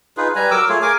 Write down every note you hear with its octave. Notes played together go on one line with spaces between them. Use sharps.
D#4 F4 G#4 B4
G3 B4 G#5 A#5
F#3 A#4 D6 E6
A3 F4 G#4 C#5
G#4 A#4 G#5 D6